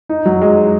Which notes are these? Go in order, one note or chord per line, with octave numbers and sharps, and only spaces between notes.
D#4
F#3
G#3